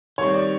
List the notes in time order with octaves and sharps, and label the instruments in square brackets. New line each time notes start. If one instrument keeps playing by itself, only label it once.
[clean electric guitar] D#3 G3 C4 [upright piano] C#5
[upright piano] D5